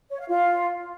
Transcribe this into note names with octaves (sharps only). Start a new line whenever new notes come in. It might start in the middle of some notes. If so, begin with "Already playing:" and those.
C#5
F5
F4